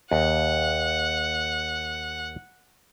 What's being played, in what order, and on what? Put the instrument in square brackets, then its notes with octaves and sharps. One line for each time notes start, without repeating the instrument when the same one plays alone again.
[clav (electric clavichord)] D#2 [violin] F#5